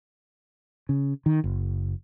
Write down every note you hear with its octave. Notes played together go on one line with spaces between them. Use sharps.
C#3
D#3
F#1